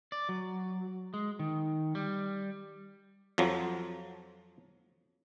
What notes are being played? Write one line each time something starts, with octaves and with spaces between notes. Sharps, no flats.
D5
F#3
G#3
D#3
G3
F2 F3 F#3